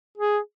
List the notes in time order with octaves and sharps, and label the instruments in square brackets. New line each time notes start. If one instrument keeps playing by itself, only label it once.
[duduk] G#4